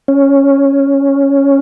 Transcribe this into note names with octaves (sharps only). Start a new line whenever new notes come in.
C#4